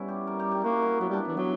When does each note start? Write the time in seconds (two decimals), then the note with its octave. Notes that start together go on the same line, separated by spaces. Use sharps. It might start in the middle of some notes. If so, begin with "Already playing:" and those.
Already playing: G3 B3 C#4 E4
0.08 G4
0.27 A#4
0.39 G4
0.51 G4
0.64 A#3 F#4
0.82 E4
1.00 F#3 B3
1.10 G3 D4
1.25 E3 B3
1.37 F#3 B3